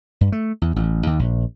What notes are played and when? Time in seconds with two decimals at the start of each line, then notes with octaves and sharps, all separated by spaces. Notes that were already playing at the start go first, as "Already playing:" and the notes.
0.21 G2
0.32 A3
0.62 E2
0.76 A1
1.07 D#2
1.19 A#1